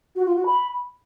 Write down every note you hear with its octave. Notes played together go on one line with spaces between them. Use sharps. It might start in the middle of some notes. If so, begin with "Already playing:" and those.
F#4
F4
F#4
B5